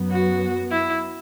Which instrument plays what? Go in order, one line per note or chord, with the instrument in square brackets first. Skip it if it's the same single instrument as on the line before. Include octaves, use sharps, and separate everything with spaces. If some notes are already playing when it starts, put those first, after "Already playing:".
Already playing: [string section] F#2 F#3 B3
[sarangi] F#4
E4